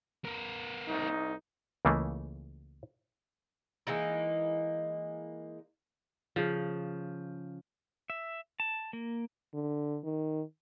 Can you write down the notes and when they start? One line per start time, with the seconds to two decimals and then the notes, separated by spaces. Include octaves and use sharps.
0.25 B3 A#4
0.87 C2 D#4
1.85 C#2 C#3 E3 A3 A#3
3.87 E3 G#3 A#3 D#4
6.36 C#3 F3
8.10 E5
8.60 A5
8.93 A#3
9.54 D3
10.04 D#3